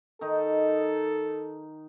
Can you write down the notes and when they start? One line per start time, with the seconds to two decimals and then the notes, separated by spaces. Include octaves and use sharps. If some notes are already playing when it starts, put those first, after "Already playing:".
0.21 D#3 D#4 A4